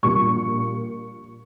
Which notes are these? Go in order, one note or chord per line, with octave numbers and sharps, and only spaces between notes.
A#1 A#2 G3 C#6